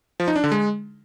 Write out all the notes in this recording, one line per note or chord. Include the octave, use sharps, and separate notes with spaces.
F3
D#4
D4
D3
G#3